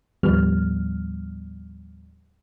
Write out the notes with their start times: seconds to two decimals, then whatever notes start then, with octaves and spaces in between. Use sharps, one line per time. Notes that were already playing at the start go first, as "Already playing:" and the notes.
0.23 D#2 A2 F3 G3 B3 F6